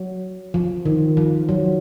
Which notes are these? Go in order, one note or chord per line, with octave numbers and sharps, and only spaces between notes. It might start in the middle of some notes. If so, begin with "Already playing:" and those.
Already playing: F#3
F3
D#3
F3
F#3